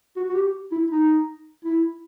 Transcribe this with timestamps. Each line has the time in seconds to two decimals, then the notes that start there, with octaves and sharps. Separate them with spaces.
0.16 F#4
0.29 F#4
0.35 G4
0.72 E4
0.90 D#4
1.64 E4